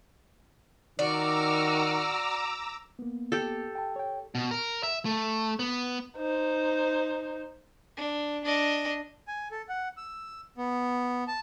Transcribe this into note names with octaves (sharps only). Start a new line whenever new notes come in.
D#3 F#4 D5 A#5 D6 E6 F6
A#3 B3
G4 A4
G5 A5
C#5 G5
B2
A#4
E5
A3
B3
D#4 C5
D4
D4 D#5
G#5
A4
F#5
E6
B3
A5